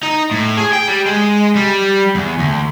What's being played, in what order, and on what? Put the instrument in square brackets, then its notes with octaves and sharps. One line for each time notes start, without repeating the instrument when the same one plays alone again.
[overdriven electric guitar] D#4
A2
G#4
G5
G3
G#3
G3
E2
D2